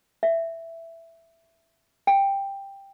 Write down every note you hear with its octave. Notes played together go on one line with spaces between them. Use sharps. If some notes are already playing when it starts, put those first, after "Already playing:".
E5
G5